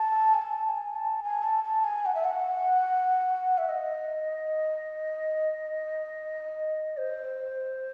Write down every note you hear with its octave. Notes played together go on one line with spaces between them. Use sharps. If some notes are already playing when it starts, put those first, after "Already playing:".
Already playing: A5
G#5
A5
G#5
A5
G#5
A5
A5
G#5
F#5
E5
F#5
E5
D#5
C5